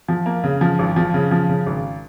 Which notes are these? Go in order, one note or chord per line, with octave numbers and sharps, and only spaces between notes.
F3
A#3
C#3
F3
G#1
F3
C#3
F3
C#3
G#1